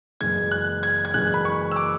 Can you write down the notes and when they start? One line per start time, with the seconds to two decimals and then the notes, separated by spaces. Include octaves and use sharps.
0.21 F#1 F#2 E3 G#3 G#6
0.51 F#6
0.83 G#6
1.05 G#6
1.14 F#1 F#2 E3 G#3 F#6
1.34 B5
1.45 C#6
1.72 E6
1.76 D6